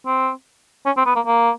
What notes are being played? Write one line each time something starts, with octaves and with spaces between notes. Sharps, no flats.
C4
C#4
C4
B3
A#3
A#3